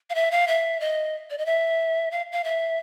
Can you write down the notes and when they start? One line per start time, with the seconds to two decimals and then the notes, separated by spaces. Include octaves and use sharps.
0.10 F5
0.15 E5
0.31 F5
0.48 E5
0.80 D#5
1.30 D5
1.38 D#5
1.46 E5
2.11 F5
2.32 F5
2.44 E5